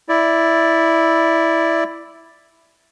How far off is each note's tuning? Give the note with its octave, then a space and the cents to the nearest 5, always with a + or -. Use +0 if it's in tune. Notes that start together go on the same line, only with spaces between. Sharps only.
E4 +0 D5 +0